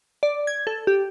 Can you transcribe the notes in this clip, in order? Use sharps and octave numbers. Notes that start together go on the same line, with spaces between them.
D5
G#6
A4
G4